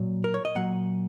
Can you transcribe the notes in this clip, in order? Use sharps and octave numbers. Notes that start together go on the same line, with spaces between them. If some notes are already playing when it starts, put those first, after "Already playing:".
Already playing: A#2 F#3
A#4
C#5
D#5
A#2 F#3 F#5